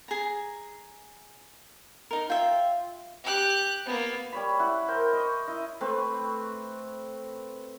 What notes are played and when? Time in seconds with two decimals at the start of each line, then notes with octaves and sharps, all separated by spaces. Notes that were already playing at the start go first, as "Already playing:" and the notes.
0.08 G#4 A#5
2.11 D#4 A#4
2.30 F4 E5 G5
3.24 G4 F#6
3.86 A#3 B3
4.32 G3 C#5 B5
4.60 E4 F#5
4.88 A#4 C5 G5 B5
5.13 D#5 C#6
5.48 E4 D#5
5.81 A3 C4 B4